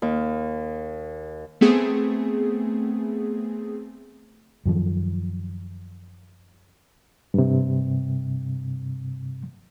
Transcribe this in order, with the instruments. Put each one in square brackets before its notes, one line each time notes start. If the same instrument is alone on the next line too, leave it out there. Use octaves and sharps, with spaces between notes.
[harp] D#2
[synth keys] A3 B3 C4 G#4
[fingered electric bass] F#2 D#3 F3
[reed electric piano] G2 C3